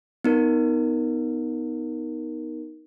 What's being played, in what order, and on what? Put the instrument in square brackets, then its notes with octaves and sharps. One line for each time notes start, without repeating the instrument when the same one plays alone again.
[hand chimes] B3 D#4 A#4